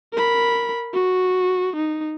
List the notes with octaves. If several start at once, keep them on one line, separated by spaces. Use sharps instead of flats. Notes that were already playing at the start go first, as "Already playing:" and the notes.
A#4 B5
F#4
D#4